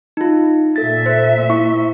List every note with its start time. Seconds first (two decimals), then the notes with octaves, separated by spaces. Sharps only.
0.17 D#4 F4
0.76 A#2 A4 E5 A6
1.06 C5
1.50 E4 C#6